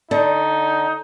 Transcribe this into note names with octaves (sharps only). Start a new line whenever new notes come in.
D3 D#4